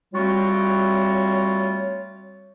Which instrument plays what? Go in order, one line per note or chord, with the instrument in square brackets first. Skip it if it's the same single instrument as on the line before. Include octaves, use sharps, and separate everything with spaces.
[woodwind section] G3 A3 C4 F4 F#4 C#5